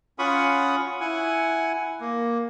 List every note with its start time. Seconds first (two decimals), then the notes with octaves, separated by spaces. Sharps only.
0.19 C#4 F4 F#5 B5 C#6 D#6
1.01 E4 F#5 G#5
2.01 A#3